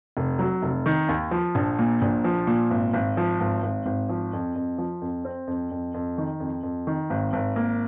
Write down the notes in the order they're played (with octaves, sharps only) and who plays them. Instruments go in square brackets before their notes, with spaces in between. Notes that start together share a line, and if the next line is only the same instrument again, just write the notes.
[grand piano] F1
F#3
F1
D#3
D#2
F3
A#1
A#2
A#1
F3
A#2
G#1
G#1
F3
G#1
G#1
G#1
F3
F2
F2
F3
F2
C4
F2
F2
F2
D#3
F2
F2
D#3
G#1
G#1
A#3